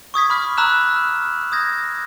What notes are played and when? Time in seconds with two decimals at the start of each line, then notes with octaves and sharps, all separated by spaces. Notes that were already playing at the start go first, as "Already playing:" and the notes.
0.14 C#6 D#6 G#6 B6
0.30 B5 D6 F6
0.58 A#5 B5 D6 E6 F#6 E7
0.96 F6
1.52 D#6 G6 G#6 A#6